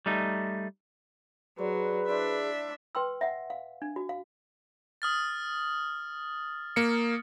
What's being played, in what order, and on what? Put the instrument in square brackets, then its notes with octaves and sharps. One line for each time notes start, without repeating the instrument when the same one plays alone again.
[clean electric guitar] G3 A3 D#4
[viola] F#3 [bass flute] G#4 [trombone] B4 [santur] C5 D5
[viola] D4 E5 [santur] E4 C5 D5
[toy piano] B4 G5 C6 E6
E5 F#5
F5
D4
F#4
F5
[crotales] D#6 F6 A6
[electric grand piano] A#3 C#7